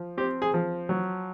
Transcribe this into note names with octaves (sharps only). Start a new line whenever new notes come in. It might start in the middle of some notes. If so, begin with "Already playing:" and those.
Already playing: F3
C4 G4
G#4
F3
F#3